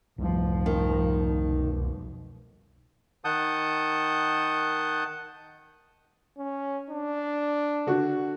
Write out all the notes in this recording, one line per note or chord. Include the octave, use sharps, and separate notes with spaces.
C2 F2 G#2 F3 G3
D#3
B1
D#3 F#5 A5 D#6 G6
C#4
D4
D3 F#4